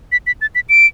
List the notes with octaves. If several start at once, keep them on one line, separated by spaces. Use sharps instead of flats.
B6
B6
A6
B6
D7